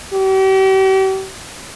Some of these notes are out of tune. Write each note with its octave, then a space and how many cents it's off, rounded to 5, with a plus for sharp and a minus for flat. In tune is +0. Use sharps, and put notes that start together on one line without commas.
G4 -40